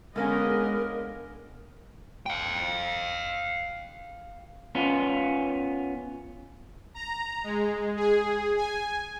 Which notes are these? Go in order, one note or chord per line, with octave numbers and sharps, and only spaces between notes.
D3 G#3 A#3 B3 C#4 A#4 D#5
F5 G5
B3 C#4 F4
A#5
G#3
G#4
G#5